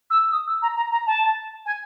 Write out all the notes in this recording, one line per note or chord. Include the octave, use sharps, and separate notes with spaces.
E6
D#6
E6
A#5
A#5
A#5
A5
G#5